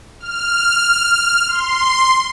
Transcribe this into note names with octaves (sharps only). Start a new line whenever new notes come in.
F6
C6